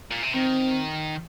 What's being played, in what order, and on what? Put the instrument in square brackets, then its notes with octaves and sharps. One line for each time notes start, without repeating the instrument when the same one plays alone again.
[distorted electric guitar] A#2
C3
[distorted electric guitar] D#3 [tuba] C4